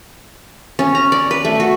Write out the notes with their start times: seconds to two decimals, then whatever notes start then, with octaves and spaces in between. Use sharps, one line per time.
0.79 C#4
0.95 A#5
1.12 D5
1.31 B4
1.45 A3
1.60 F#4